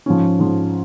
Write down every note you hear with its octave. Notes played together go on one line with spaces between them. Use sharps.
G#2 F3 C#4
G#2 F3